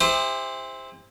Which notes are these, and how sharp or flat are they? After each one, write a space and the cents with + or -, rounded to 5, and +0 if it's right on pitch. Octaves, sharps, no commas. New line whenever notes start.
E4 -15 G4 +40 C5 +0